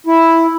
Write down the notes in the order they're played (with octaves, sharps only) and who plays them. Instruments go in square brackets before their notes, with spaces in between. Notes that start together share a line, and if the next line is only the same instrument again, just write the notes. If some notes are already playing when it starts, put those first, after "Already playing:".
[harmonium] E4